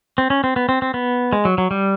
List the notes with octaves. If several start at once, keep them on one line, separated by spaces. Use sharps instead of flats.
C4
C#4
C4
B3
C4
C4
B3
G#3
F#3
F#3
G3